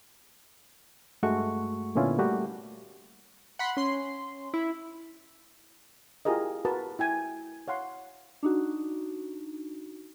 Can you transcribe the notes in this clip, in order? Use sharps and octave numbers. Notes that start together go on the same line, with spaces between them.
G2 G#3 A3 F#4 C#6
A#2 D3 B3 C#4 E4 F4
G3 A3 A#3 F#4 G4
F#5 B5 C6
C#4 C6
E4
E4 F4 G4 G#4 A#4 D#5
F#4 A#4 B4 A5
E4 G5 G#5
C#5 F5 F#5 C6
D4 D#4 F#4